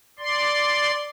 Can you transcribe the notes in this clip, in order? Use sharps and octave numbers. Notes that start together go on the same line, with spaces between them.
D5 C6